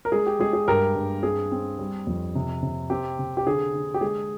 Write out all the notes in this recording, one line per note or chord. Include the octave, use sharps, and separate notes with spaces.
A#4
G#3 G#4
G4
G#3 G#4
G#4
G2 G4 A#4
G2
C4 G#4
C4
G3
F2
C3
C3
C4 G4
C3
G4
D3 G#4
D3
G4
G#3 G#4